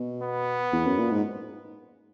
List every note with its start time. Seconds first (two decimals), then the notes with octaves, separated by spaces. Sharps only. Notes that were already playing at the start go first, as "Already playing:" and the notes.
Already playing: B2
0.22 B3
0.72 E2
0.86 F#2
0.99 A#2
1.11 G#2